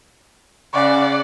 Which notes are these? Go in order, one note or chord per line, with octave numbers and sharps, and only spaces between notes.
C#3 D5 F#5